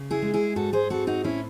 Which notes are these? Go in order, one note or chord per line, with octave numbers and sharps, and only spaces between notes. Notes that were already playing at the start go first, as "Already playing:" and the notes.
Already playing: C#3
E4 G#4
G#3
E4 G#4
G#2 F#4 A4
G#4 C5
C4 F#4 A4
D#4 F#4
A2 C#4 E4